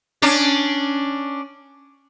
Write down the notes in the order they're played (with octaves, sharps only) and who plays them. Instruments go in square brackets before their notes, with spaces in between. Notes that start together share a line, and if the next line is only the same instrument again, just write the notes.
[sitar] C#4 D4